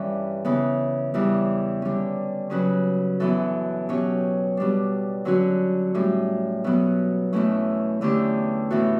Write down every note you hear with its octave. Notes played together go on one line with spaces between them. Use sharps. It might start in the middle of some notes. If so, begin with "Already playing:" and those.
Already playing: G2 E3 G3 C#4
C#3 E3 B3
E2 C#3 E3 G3
D3 G3 C#4
C#3 F#3 C#4 F#4 B4
F#2 E3 B3 F#4 A4
B2 F#3 C#4 G4 C#5
B2 G3 D4
D3 F#3 C#4 F#4
A2 G3 C#4
B2 F#3 B3
E2 B2 A3 C#4 E4
E2 D3 A3 C#4 G4
A2 E3 B3 F#4 A4